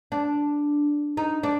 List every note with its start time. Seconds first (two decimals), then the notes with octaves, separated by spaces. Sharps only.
0.12 D4
1.17 D#4
1.43 D4